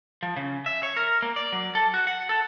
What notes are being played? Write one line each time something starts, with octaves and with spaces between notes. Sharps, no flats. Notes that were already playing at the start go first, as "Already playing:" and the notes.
F3
C#3
E5
C#5
A#4
A#3
D5
F#3
A4
F#4
F#5
A4